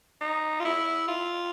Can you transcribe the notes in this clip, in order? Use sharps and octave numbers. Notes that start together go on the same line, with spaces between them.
D#4
F4
E4
F4